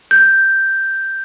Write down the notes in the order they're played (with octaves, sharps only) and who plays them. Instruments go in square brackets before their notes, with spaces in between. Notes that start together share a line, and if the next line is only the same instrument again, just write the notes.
[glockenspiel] G6